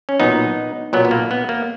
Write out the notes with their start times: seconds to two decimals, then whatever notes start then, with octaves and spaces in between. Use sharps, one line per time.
0.09 C#4
0.20 B1 A#2 F#3 B3 D#4
0.93 B1 A#2 F#3 B3
1.05 B3
1.11 A#3
1.31 B3
1.49 A#3